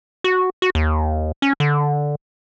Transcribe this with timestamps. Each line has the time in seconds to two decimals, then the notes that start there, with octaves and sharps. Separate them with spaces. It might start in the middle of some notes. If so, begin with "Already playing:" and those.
0.24 F#4
0.62 F#4
0.75 D#2
1.42 C#4
1.60 D3